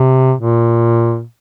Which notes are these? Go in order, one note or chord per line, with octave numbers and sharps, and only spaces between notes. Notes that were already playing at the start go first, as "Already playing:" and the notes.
Already playing: C3
A#2